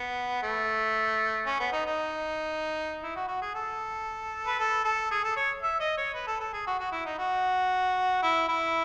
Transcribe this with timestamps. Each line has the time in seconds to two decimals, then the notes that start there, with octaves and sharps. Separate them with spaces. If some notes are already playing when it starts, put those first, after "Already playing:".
Already playing: B3
0.43 A3
1.47 C#4
1.60 B3
1.73 D#4
1.86 D#4
3.03 E4
3.16 F#4
3.28 F#4
3.42 G#4
3.55 A4
4.47 B4
4.59 A4
4.84 A4
5.11 G#4
5.24 A4
5.37 C#5
5.63 E5
5.80 D#5
5.97 C#5
6.14 B4
6.27 A4
6.40 A4
6.53 G#4
6.67 F#4
6.80 F#4
6.92 E4
7.06 D#4
7.18 F#4
8.23 E4
8.49 E4